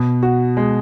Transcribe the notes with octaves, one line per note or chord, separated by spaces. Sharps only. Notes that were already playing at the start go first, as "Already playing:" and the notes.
Already playing: B2
F#4
G#3